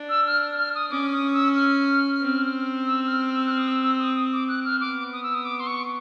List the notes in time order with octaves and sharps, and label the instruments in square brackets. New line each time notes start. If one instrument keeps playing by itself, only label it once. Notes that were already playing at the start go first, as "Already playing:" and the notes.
Already playing: [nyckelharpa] D4
[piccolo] E6
F6
F6
D#6
[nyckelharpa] C#4 [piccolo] D6
[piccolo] D#6
E6
F6
[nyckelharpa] C4
[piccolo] E6
F6
E6
F#6
F6
D#6
E6
E6
D#6
D#6
D6
F#6
F6
[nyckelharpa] B3 [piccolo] D6
[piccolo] D#6
E6
D#6
D6
C6
C#6